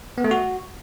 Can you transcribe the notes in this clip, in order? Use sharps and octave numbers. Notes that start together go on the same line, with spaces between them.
B3
A3
F#4